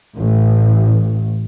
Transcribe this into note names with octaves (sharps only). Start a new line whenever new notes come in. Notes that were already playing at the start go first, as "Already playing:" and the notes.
A1